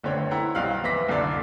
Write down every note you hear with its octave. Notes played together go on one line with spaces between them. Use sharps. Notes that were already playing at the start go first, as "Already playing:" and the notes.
G1 D3 A3 C4 C#5 G5
E4 F#5 G5 A#5
B1 G3 C4 F5 F6 F#6
E2 B4 E5 D6 A#6 B6
C2 F#2 D3 A4 D5